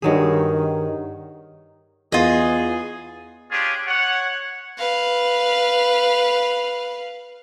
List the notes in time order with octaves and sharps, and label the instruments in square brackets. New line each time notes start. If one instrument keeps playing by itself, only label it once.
[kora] G2 F#3 G#4 [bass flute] D#3
[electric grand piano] E2 B3 [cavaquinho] F4 D#5 [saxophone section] G#4
[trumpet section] C#4 D4 F4 G4 G#4
C#5 F#5
[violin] B4 F5